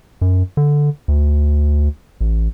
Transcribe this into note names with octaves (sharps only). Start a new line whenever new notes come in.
F#2
D3
D2
A1